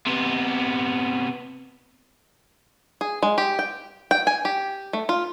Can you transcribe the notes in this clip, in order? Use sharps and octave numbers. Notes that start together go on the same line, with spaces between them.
C3 B3
G#4
G#3
G4
G5
G5
G#5
G4
A3
F4